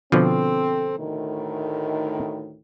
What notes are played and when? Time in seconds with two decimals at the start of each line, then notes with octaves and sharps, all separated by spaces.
0.12 B2 D3 F3 C4 A4
0.97 D2 A2 D#3